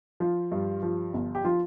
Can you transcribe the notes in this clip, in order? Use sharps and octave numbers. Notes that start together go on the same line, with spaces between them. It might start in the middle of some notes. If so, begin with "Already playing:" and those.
F3 F4
G2
F3
G1
G4
F3 F4